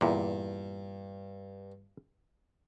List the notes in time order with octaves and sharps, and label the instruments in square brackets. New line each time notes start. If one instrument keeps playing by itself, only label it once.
[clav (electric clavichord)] E2 A#2 [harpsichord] G2